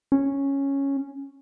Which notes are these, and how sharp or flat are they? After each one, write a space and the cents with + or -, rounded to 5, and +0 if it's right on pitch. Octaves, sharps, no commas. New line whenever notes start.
C#4 -5